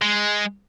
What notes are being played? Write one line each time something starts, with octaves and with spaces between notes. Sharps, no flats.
G#3